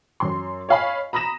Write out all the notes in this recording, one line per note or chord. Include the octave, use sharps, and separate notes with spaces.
F#2 C6
C#5 D#5 F5 G#5 B5
A#5 B5 D#6 A#6 E7